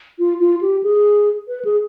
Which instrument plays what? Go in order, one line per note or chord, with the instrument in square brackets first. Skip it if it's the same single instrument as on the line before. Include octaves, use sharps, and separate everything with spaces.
[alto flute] F4
F4
G4
G#4
B4
G#4